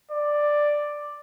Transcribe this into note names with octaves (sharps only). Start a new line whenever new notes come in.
D5